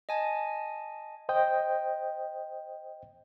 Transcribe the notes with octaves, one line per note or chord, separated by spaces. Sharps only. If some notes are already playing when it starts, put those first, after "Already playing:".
D#5 G#5 A5
C5 D#5 G5